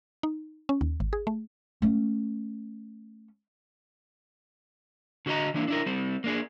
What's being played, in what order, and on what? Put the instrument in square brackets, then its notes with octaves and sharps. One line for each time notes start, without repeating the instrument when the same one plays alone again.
[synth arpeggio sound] D#4
C#4
D#2
G#1
G#4
A3
[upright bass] A3 C#4
[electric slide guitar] D3 F#4 A4 D#5 A#5
E3 A#3 D4 E4
D4 E4 A#4
G3 C4
A#3 D4 G#4